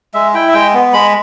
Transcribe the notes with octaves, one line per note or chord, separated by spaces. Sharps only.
G#3 E5
E4 G5
E5
G#3 G5
B3
G#3 B5